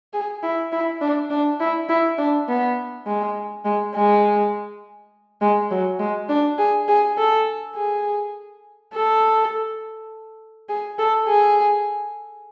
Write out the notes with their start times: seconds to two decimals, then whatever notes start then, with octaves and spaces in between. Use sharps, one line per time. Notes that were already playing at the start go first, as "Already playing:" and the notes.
0.13 G#4
0.43 E4
0.72 E4
1.01 D4
1.30 D4
1.60 E4
1.89 E4
2.18 D4
2.48 B3
3.06 G#3
3.65 G#3
3.95 G#3
5.41 G#3
5.71 F#3
5.99 G#3
6.29 D4
6.58 G#4
6.88 G#4
7.17 A4
7.75 G#4
8.93 A4
10.69 G#4
10.99 A4
11.28 G#4